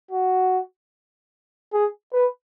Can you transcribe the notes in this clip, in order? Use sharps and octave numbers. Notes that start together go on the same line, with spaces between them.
F#4
G#4
B4